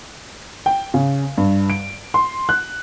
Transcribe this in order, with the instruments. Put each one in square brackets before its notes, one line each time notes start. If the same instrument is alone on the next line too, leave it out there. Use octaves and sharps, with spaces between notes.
[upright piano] G5
C#3
G2
D7
C6
F#6